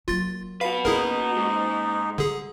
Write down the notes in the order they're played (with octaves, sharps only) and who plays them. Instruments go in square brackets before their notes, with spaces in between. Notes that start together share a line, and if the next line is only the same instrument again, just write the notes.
[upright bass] F#3 A#3 [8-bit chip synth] F4 A6
[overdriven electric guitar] F#4 B4 [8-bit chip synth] F5
[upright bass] A#3 C#4 [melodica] D#4 [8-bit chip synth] E4 G#4 A#4
[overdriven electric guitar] G#2
[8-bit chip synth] D3 G#4 [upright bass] G3